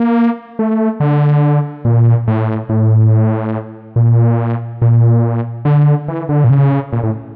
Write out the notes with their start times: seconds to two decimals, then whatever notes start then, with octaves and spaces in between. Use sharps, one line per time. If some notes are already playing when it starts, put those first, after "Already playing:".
Already playing: A#3
0.59 A3
1.00 D3
1.85 A#2
2.28 A2
2.69 A2
3.96 A#2
4.82 A#2
5.65 D3
6.08 E3
6.29 D3
6.44 A#2
6.50 C#3
6.93 A#2
7.03 A2